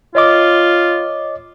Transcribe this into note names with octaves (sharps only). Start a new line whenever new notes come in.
F4 C#5 D#5 D6